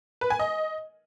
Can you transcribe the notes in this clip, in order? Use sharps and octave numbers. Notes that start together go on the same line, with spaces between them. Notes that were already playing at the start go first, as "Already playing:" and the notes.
B4
G#5
D#5